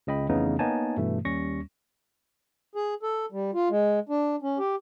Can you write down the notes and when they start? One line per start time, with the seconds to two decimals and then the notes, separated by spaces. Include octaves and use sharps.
0.07 C#2 C#3 D#5 G5 B5
0.29 F2 C#3 E3 A3 B3 D#4
0.59 A#3 B3 D#4 C#5 G#5 A5
0.97 G2 B2 E3 A3
1.25 D#2 G3 C#4 C#6 A#6
2.75 G#4
3.03 A4
3.32 G3
3.54 F4
3.70 G#3
4.09 D4
4.42 C#4
4.58 G4